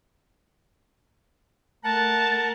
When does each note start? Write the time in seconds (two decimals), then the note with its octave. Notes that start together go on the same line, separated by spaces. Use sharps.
1.84 A3 A#4 F#5 A5